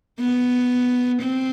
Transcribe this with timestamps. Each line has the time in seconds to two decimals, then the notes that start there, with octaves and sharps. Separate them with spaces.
0.20 B3
1.22 C4